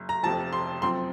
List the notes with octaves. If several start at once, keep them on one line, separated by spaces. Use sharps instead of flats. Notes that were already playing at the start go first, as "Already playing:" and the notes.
Already playing: F#1
A#5
F1 F2 C3 F3 A5
C6
F#2 F3 C4 C6